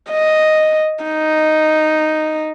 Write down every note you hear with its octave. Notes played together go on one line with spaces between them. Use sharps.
D#5
D#4